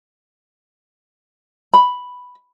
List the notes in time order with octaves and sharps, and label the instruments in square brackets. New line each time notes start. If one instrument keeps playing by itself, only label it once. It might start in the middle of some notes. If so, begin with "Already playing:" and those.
[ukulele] B5